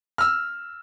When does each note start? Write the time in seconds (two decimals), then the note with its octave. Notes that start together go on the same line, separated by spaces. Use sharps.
0.18 E6 F6